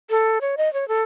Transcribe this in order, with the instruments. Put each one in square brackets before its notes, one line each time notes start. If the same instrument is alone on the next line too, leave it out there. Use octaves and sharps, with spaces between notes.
[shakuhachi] A4
C#5
D#5
C#5
A4